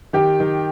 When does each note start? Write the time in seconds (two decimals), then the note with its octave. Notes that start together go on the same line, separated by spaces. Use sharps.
0.13 D#3 G4
0.40 D#3